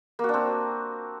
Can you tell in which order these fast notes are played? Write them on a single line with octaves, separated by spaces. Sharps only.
A#3 F#4 D4 C4